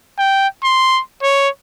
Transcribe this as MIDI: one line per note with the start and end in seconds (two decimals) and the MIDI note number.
0.19 0.47 79
0.64 1.02 84
1.22 1.49 73